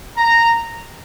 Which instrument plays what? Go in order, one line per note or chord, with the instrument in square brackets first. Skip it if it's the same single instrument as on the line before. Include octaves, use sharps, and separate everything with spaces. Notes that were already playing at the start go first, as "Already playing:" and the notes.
[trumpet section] A#5